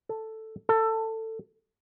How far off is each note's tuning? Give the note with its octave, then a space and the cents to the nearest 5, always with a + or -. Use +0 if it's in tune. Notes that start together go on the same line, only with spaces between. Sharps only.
A4 +5
A4 +20